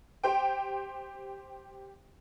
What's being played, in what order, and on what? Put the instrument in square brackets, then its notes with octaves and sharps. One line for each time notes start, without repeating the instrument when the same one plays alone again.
[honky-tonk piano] G4 C5 G5